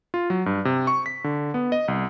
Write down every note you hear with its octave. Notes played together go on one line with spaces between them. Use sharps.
F4
F#3
G2
C3
C#6
B6
D3
B3
D#5
C2